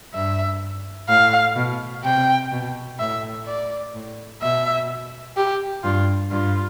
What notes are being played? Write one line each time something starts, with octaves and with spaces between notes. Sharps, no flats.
G2 E5
A2 F5
B2
C3 G5
B2
A2 E5
D5
A2
B2 E5
G4
G2 F4
G2 F4